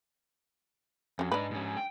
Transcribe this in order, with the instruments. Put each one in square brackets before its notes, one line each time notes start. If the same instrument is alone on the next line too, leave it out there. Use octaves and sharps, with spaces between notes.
[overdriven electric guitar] F2 [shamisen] F#3 C#4
[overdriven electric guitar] G#2 D#4 [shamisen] D4 B4
[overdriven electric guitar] G#2 C#4
G5